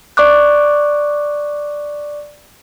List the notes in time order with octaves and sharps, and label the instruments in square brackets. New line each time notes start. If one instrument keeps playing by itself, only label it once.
[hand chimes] D5 C#6 D6 F#6